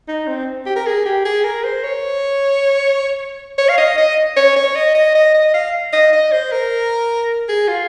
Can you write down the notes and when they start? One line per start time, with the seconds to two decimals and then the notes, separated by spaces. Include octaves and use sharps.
0.08 D#4
0.28 C4
0.66 G4
0.76 A#4
0.87 G#4
1.06 G4
1.25 G#4
1.44 A#4
1.64 C5
1.84 C#5
3.58 C#5
3.69 F5
3.78 D#5
3.98 D#5
4.37 C#5
4.56 C#5
4.76 D#5
4.95 D#5
5.15 D#5
5.34 D#5
5.54 F5
5.93 D#5
6.13 D#5
6.32 C5
6.52 A#4
7.49 G#4
7.68 F4